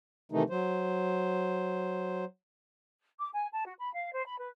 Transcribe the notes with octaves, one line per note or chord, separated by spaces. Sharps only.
C3 D#3 E3 A3 D#4
F#3 C5
D6
G#5
A5
F#4
B5
F5
C5
B5
B4